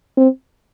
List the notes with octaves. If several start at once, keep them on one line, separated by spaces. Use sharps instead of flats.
C4